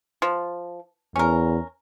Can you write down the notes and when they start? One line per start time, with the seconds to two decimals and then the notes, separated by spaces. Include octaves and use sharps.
0.22 F3
1.16 E2 C#4 A#4